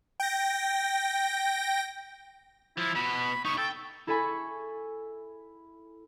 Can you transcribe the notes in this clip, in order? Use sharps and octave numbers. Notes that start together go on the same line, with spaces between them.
G5 A#6
F3 E4
B2 F#4 B5
D#4 C#5 C#6
A4 G5
E4 A4 E5 G#5 B5 C#6